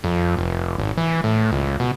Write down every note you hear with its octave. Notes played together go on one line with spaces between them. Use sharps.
F2
F1
G#1
E3
A2
C#2
B2